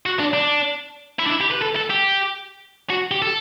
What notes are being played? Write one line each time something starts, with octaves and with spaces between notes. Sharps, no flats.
F#4
D4
D4
E4
D4
E4
G4
B4
A4
A4
G4
F#4
G4
A4